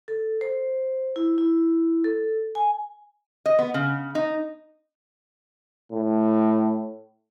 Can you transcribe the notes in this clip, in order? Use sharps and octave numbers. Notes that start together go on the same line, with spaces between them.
A4
C5
E4
E4
A4
G#5
D#5
B3
C#3
D#4
A2